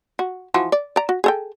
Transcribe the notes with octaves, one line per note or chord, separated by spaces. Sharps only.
F#4
E3 F3 F#4
D5
D5 A#5
F#4
G#4 A4 G5